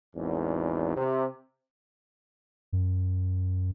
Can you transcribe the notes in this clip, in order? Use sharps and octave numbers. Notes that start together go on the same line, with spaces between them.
G#1 E2
C3
F#2